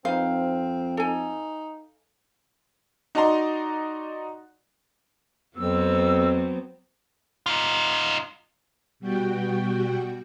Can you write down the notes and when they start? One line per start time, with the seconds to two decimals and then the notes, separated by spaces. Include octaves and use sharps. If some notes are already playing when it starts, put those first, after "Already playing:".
0.05 F2 C4 D#4 B4 C5 F5
0.97 D#4 A4 G#5
3.15 D#4 F#4 D5 D#5 A#5 C6
5.57 F2 F#3 B3 C4 E6
7.46 D#4 F4
9.00 B2 G3 F#4 G5